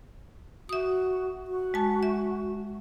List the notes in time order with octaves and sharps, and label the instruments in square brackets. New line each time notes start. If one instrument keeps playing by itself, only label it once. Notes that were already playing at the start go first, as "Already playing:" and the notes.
[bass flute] F#4 [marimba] E5 D#6
[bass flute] F#4
[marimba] G#3 A5
E5